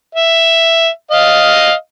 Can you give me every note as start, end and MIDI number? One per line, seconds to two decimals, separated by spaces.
0.15 0.89 76
1.11 1.73 75
1.11 1.73 77